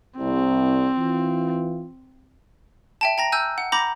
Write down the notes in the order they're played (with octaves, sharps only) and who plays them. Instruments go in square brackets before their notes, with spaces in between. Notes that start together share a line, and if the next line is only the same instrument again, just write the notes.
[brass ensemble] C2 [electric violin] C4
[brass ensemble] E3 F4
[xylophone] E5 G5 A5
G5 A#5 A#6
G#5 E6 F#6 G6
F#5
A#5 B5 D6 G6 A#6